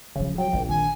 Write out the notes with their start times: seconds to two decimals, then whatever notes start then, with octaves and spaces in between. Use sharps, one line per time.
0.16 D1 C#3 F3
0.38 F#3 G5
0.53 A#1 E3 C4
0.69 D#3 G#5